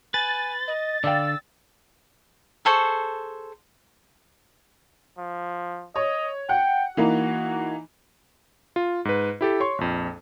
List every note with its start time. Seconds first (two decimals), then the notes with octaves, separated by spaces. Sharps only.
0.14 B4 G#5 A6
0.68 D#5
1.04 D3 D5 F5 G5 E6
2.65 G#4 A4 C5 C#6
5.18 F3
5.96 C#5 D#5
6.49 F#5 G5
6.97 E3 A#3 D#4 F#4
8.76 F4
9.05 G#2 B4
9.41 E4 G4 A4
9.60 C#5 C6 C#6
9.78 A#1 F2